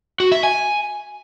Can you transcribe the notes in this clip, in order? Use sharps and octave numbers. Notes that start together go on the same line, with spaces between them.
F#4
E5
G#5